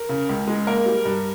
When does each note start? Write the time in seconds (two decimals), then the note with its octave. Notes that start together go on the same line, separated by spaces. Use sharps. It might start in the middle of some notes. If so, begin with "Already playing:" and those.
Already playing: A#4
0.09 C#3
0.29 C#2
0.47 G#3
0.67 A#3 A#4
0.86 G3
1.05 G2